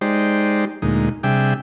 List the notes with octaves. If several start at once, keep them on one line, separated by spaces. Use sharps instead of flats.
G#3 D#4 G4 C5 D5
D2 A#2 G#3 D#4
C3 G3 D4 G#4 E5 G5